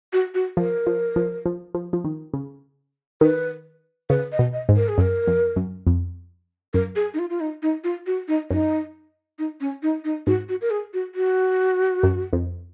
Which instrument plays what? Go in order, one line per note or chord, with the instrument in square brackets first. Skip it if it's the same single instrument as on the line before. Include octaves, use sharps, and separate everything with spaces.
[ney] F#4
F#4
[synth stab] F3 [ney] A#4
[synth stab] F3
F3
F3
F3
F3
D#3
C#3
[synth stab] D#3 [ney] B4
[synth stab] C#3 [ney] B4
[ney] D#5
[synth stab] B2
[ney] D#5
[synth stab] G#2
[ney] A#4
G#4
[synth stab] F#2 [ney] A#4
[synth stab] F2
F#2
F2
[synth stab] F#2 [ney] A#4
[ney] G#4
D#4
F4
F4
D#4
D#4
F4
F#4
D#4
[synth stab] F#2 [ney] D#4
[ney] D#4
C#4
D#4
D#4
[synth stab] G#2 [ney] F#4
[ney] F#4
A#4
G#4
F#4
F#4
[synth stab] F#2
F2